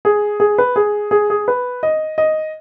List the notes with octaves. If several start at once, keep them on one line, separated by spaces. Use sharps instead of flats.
G#4
G#4
B4
G#4
G#4
G#4
B4
D#5
D#5